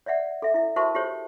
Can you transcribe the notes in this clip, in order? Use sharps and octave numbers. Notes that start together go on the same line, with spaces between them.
C#5 D5 E5 F#5
A4 E5
E4 E5
F#4 A#4 C5 E5 A5 C#6
F4 G4 A4 C5 C#5